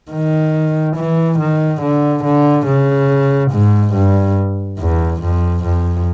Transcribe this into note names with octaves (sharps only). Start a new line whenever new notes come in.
D#3
E3
D#3
D3
D3
C#3
G#2
G2
E2
F2
F2